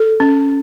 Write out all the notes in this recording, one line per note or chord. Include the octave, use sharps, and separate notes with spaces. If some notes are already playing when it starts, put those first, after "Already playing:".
Already playing: A4
C#4